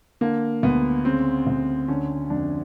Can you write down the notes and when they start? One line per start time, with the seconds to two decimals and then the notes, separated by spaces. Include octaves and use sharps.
0.21 D3 A#3
0.63 D2 B3
1.05 C#3 C4
1.47 D2
1.88 D3 C#4
2.30 F2 D4